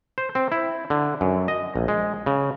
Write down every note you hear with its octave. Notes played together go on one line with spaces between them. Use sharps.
C5
C4
E4
D3
F#2
D#5
A#1
G#3
C#3